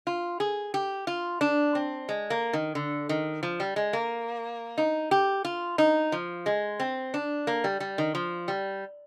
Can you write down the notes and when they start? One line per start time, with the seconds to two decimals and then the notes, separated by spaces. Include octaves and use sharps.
0.07 F4
0.40 G#4
0.74 G4
1.07 F4
1.41 D4
1.75 C4
2.09 G#3
2.30 A#3
2.53 D#3
2.75 D3
3.09 D#3
3.43 F3
3.60 G3
3.76 G#3
3.93 A#3
4.78 D#4
5.11 G4
5.45 F4
5.78 D#4
6.12 F3
6.46 G#3
6.80 C4
7.14 D4
7.47 A#3
7.64 G3
7.80 G3
7.98 D#3
8.15 F3
8.48 G3